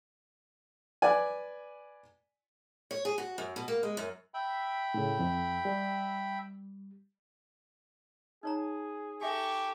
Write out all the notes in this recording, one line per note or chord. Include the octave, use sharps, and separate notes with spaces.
B4 D5 G#5
C#5
G#4
F#4
F#2
B2
A#3
G#3
F#2
E5 G5 B5
A2 C#3
F2
G3
D#4 G#4 C#5 A#5
G4 A4 E5 G#5 C#6